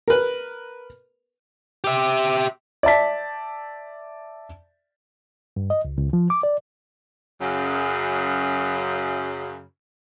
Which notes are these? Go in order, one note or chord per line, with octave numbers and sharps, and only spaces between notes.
A#4 B4
G4 E5
D5 E5 A5 B6
G2
D#5
C#2
C#2
F3
D6
D5
F#2 C#3